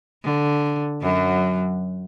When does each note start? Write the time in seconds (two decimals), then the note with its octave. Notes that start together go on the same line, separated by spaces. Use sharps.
0.24 D3
1.02 F#2 F#3